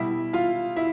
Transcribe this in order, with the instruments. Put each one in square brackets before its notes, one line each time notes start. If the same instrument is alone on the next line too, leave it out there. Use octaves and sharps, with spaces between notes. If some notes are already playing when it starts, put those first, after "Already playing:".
Already playing: [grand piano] B2 G3 E4 E5
F4 F5
E4 E5